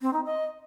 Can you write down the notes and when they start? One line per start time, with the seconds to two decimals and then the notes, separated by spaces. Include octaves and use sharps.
0.01 C4
0.13 D#4
0.25 D#5